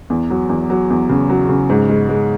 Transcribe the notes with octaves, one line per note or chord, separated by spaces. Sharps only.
E2
F#3
E2
F#3
E2
C#3
F#3
C#3
G#2
G#3
G#3